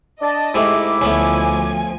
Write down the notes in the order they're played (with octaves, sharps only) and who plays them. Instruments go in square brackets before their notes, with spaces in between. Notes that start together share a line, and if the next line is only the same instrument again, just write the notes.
[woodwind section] D4 D5 A5 [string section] D#5
[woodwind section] G#2 E4 D6 [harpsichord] C3 G#3 A3
[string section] D2 F3 G#5 [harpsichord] A3 B3 C#4